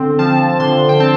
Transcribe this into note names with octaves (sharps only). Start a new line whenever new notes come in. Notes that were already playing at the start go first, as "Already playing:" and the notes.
Already playing: D3 C4
F3 A5
D3 C6
G5
C4 A5